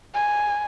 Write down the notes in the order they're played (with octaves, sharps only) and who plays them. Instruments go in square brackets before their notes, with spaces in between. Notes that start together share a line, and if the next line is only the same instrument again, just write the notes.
[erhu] G#5